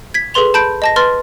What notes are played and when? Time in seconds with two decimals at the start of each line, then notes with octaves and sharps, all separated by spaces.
0.14 G#6 B6
0.34 G#4 A4 B4 C6 F7
0.54 A5 B5 G6 D7
0.82 D#5 A5 A#6
0.96 B4 C6 F6 A6